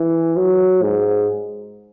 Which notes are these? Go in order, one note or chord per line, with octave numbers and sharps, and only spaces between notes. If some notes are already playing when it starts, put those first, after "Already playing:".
Already playing: E3
F#3
G#2